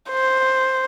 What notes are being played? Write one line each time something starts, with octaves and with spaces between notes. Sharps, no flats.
C5